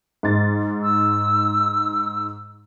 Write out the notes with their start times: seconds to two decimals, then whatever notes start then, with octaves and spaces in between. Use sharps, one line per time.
0.23 G#2 A6
0.83 E6